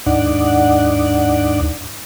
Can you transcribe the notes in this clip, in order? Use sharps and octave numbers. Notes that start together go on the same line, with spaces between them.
D#2 G#2 D4 D#4 D5 F#5